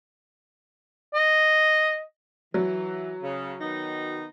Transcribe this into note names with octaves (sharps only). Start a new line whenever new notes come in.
D#5
E3 F#3
C#3
D#3 B3 D#4